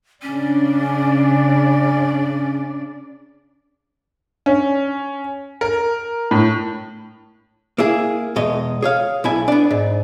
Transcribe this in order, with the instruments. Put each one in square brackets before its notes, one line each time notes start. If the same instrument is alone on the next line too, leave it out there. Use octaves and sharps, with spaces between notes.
[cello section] C#3 D4 D5 [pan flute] C#4
[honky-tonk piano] C#4
A#4
A2
[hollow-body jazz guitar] A#3 E4 G#4
E2 B2 G#3 D#5
G#4 C#5 F5
B1 E4 G#5
B3 D4
G#2